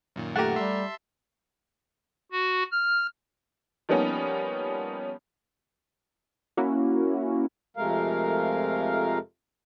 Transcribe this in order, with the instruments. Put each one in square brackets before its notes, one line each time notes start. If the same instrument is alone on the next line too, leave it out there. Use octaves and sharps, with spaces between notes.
[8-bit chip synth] F#2 A#2 D#3
[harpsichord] A3 A#4 [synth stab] G4 F#5
[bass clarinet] G3 [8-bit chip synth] E5 A5 C6
[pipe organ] F#4
F6
[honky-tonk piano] F3 G3 A#3 B3 C#4 D#4
[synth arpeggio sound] A#3 C#4 E4 F#4
[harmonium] F2 C3 G#3 A3 A#4 F5